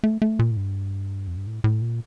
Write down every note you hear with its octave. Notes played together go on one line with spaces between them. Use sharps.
A3
A3
A#2
A2
G2
F2
G2
A2
A2
A#2